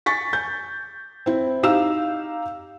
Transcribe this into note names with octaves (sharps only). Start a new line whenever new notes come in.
G#5 C#6 A6 B6
G6
C4 E4
D#4 G4 F5 E6 E7